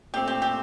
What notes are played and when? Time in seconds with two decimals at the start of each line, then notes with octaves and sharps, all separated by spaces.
0.13 A#2 A3 C4 G4
0.28 G4
0.42 G4